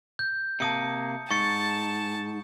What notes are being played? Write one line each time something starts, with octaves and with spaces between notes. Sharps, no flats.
G6
C3 A#3 A5 D#6 C#7
G#2 A5 C#6 A6 C#7